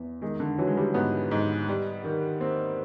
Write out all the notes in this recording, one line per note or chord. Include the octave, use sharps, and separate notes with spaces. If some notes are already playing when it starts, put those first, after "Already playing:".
Already playing: E2 B3
D#3 G#3
D3
E3 F#3
G#3
G3
G#2 B3
G#2
G3
D#3
A#3 C4